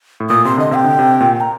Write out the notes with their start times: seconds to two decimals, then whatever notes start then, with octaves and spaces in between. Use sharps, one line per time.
0.20 A2
0.29 A#2 D#6
0.45 C3 C6
0.58 D3 D#5
0.71 C3 G5
0.84 D3
0.99 C3
1.20 A#2
1.41 A#5